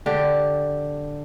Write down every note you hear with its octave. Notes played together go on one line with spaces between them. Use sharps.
D3 G4